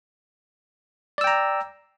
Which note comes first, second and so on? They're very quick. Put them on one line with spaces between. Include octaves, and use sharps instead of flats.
D5 E6 G5 A#5